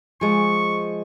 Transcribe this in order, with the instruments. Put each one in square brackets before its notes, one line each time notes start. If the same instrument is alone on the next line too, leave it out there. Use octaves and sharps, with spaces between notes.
[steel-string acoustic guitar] F3 G#3 [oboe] C#6